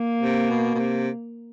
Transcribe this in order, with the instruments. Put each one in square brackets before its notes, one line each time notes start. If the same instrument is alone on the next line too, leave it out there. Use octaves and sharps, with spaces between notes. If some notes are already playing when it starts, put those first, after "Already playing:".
Already playing: [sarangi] A#3
[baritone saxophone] C3
B2
B2
C3